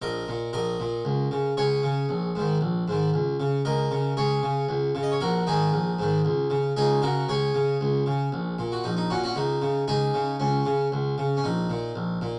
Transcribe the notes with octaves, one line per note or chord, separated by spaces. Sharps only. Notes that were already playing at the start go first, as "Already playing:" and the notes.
A#1 A#4 D#5
A#2
A#1 A#4 D#5
A#2
C#2
C#3
C#2 G#4 C#5
C#3
A#1
G#2 D#3
A#1
G#2 D#3
C#2
C#3
C#2 A#4 D#5
C#3
C#2 G#4 C#5
C#3
C#2
C#3
D#5
C#5
A#1 F#4 A#4
G#2 D#3 D#4 G#4
A#1
G#2 D#3
C#2
C#3
C#2 D#4 G#4
C#3 F#4 A#4
C#2 G#4 C#5
C#3
C#2
C#3
A#1
A#2
F#4
A#1 D#4
D#4
A#2 C#4 F#4
C#4 F#4
C#2 D#4
C#3
C#2 D#4 G#4
C#3
C#2 C#4
C#3
C#2
C#3
C#4
A#1 D#4
A#2
A#1
A#2